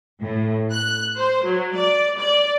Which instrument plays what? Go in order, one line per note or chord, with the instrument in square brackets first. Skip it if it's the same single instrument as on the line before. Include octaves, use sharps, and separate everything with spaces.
[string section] A2
F#6
C5
F#3
D5
D5